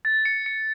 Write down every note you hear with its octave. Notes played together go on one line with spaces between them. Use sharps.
A6
C#7
C#7